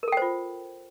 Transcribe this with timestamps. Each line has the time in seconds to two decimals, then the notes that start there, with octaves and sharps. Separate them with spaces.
0.03 A#4
0.08 A4
0.12 G5
0.17 C5
0.22 F4